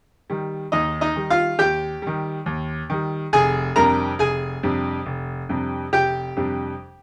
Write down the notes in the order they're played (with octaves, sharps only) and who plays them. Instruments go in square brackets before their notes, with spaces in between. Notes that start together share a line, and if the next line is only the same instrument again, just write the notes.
[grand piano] D#3 G3
[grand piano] D#2 [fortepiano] D#4 D#5
[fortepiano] D#4 D#5
[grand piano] D#3 G3
[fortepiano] F4 F5
[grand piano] D#2 [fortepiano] G4 G5
[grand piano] D#3 G3
D#2
D#3 G3
[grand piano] F1 [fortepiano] G#4 G#5
[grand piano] F2 C3 G3 D4 [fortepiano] A#4 A#5
[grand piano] F1 [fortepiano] G#4 G#5
[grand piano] F2 C3 G3 D4
F1
F2 C3 G3 D4
[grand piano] F1 [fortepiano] G4 G5
[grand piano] F2 C3 G3 D4